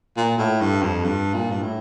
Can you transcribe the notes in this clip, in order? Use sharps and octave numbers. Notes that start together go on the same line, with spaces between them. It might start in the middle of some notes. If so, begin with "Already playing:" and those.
A#2
A2
G2
F2
G2
A#2
G2
A2